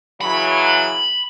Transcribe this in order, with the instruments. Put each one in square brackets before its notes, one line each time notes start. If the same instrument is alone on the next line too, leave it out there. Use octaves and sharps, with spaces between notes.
[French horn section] C#3 E3 F#3 [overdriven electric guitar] B5